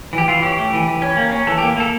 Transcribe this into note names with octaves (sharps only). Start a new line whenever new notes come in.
E3
G4
E3 F4
C#4 G4
A3
E3
E3
C#4
A#3
C#4
E3 A4
A#3 G4
A#3 A4